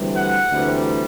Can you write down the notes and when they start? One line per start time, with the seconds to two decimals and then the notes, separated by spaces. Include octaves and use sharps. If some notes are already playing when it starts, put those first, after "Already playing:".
Already playing: D2 C3 E3 G3
0.17 F#5
0.51 D2 C3 E3 G3